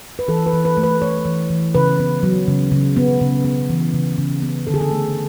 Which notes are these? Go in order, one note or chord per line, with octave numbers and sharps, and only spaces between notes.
B4
E3 A4
B4
E3
B4
A3
B4
A3 C#5
E3
E3
C#3 B4
B3
F#3
C#3
C#3
B3
C#3
B3
E3
C#3
C#3
B3
D3 A4
G#4
A4
A3